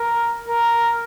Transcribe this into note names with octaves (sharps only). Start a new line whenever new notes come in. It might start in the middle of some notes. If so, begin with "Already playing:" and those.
Already playing: A#4
A#4